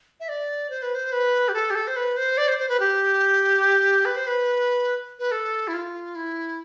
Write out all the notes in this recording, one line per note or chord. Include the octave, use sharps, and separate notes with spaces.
E5
D5
C5
B4
C5
B4
G4
A4
G4
A4
C5
B4
C5
D5
C5
C5
B4
G4
B4
C5
B4
B4
A4
E4
F4
E4